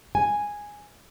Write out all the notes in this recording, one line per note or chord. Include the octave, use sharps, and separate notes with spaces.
G#5